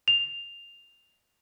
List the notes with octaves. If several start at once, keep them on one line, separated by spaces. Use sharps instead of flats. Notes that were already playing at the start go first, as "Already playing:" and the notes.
F7